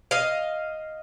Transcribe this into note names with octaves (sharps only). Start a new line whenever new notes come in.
D#5 F5